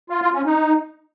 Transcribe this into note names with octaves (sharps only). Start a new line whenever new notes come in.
F4
F4
C#4
D#4